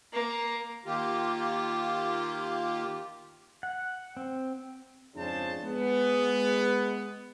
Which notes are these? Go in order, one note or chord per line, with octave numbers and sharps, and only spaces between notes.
A#3
D#3 A#3 F4 G4
F#5
C4
F2 G#2 C#3 D4 C5 A5
G#3 B3